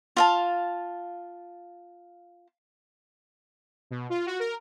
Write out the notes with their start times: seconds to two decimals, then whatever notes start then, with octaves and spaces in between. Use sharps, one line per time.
0.17 F4 F5 A5
3.91 B2
4.10 F4
4.26 F#4
4.40 A#4